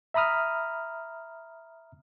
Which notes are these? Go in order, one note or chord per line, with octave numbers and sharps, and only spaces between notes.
E5 A#5 B5 D#6 F6